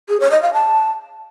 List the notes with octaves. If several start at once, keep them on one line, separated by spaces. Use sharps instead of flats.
G#4
C#5
D#5
F5
A5